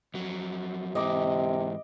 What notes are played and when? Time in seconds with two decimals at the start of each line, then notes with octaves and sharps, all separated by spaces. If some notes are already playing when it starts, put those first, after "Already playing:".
0.14 F2 F#3
0.95 G#2 C3 E3 D#5 D6